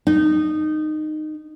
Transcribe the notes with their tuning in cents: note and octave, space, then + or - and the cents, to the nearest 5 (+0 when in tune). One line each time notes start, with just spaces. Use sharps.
D#4 -15